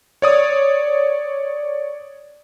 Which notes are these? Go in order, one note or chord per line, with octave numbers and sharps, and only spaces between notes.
C#5 D5 D#6